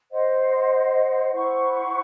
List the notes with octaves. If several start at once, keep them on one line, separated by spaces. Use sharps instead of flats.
C5 D#5 F#5
E4 C5 F#5 C#6